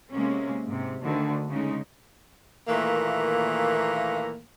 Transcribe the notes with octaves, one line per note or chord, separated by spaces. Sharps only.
C3 G#3 A#3 C#4
G#2 C3
D2 D3 D#3
C#3 G#3 D#4
A#2 D#3 E3 A3 A#3